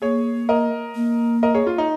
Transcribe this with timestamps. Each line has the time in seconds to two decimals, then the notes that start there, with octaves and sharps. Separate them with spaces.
0.02 A#3 G#4 C#5
0.49 A#4 D#5
0.95 A#3
1.43 A#4 D#5
1.55 G#4 C#5
1.67 F4
1.78 D#4